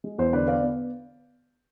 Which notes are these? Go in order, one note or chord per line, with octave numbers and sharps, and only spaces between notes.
G#3
E2 C5
D3 B4 D5
B3 D5 F5
B3